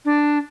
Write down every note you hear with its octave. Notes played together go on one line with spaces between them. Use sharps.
D4